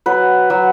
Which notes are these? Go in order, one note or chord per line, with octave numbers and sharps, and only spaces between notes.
F#3 B4
F#3